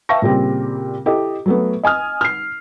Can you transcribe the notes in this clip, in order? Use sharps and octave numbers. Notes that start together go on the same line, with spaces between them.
E5 F5 G5 A5 C#6 A#6
A#2 C#3 G3 C4
E4 G4 A4 D#5
F#3 A3 B3
D#5 G#5 D#6 F6
F6 C7